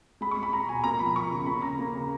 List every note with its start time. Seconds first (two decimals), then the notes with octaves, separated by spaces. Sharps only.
0.21 G#3 B5
0.31 C#6
0.37 G#3
0.43 B5
0.52 G#3 A#5
0.69 B2 G#5
0.84 A#3 A#5
0.99 F3 B5
1.16 F3 C#6
1.31 C#3
1.46 A#3 B5
1.62 C#3 A#5
1.79 A#3
1.94 C#3